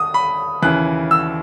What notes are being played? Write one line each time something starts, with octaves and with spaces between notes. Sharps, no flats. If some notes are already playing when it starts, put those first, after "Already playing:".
Already playing: D#2 D#6
B5
D#2 C#3 E3 F#6
E6